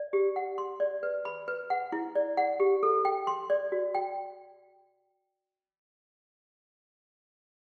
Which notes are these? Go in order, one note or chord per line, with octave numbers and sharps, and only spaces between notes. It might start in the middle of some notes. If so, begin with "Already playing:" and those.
Already playing: D5
G4
F#5
C6
D5
B4
B5
B4
F#5
E4
D5
F#5
G4
A4
G5
C6
D5
F#4
G5